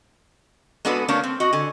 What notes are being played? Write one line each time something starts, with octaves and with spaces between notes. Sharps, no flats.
G#3 B3 D4 F#4 A4 B4
A3 A#3 C#4 D4
C4
F#4 D#5
D3 G#5